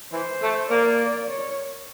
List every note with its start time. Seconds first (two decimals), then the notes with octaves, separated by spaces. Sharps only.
0.13 E3 C5
0.42 A3
0.70 A#3 D5
1.29 C#5